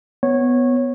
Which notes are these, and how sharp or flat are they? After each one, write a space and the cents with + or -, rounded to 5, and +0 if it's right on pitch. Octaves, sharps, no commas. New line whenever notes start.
B3 +5 C#5 -15